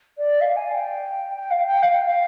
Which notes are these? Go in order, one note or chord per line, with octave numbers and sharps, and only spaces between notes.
D5
F5
G#5
G5
G5
F5
G5
F5
F5